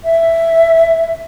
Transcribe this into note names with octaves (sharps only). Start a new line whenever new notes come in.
E5